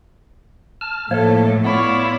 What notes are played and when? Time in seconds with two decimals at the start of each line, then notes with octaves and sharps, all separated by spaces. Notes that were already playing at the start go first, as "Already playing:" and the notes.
0.81 A5 F6
1.11 A2 F3 A#3 A4 C#5 E5
1.64 B3 E4 F4 C#5 D5